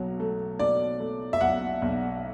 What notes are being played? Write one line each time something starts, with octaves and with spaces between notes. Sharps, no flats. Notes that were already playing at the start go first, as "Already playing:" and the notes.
Already playing: B1 B2 F#3
A3
B2 D5
A3
E5
B1 F#5
B1